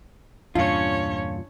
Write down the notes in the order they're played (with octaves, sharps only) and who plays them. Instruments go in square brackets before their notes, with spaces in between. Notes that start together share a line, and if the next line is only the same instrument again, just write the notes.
[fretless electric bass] E2 G2 A#2 [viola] C#4 C#5 [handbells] D4 C#7 [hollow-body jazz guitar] F4